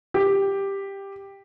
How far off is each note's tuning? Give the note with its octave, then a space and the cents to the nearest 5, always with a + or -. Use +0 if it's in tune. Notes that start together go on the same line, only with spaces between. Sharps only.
G4 +5